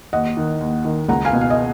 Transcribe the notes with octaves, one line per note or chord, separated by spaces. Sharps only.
D#2 D#5 F#5
D#3
D#2
D#3
C#2 F#5 A#5
F5 G#5
B2
F5
D#5